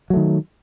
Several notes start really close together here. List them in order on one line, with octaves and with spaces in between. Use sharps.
F#3 A3 D#3